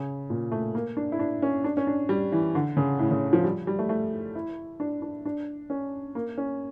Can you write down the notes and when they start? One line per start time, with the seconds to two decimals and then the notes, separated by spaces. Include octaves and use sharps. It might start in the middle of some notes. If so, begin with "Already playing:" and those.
Already playing: C#3
0.30 A#2
0.52 A3
0.75 A#3
0.97 D4
1.12 E4
1.19 D4
1.42 C#4
1.64 D4
1.77 C#4
1.87 D4
2.09 G3
2.32 E3
2.55 D3
2.77 C#3
2.99 A2
3.11 C#3
3.33 F3
3.44 G3
3.67 G3
3.79 A3
3.89 A3
4.35 E4
4.80 D4
5.02 D4
5.25 D4
5.70 C#4
6.15 A#3
6.38 C#4